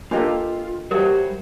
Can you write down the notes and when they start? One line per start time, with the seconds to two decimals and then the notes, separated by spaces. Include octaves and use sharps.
0.11 A#3 D4 F4 G4 A4 D#5
0.91 G3 F#4 G4 A#4 C5 C#5 E5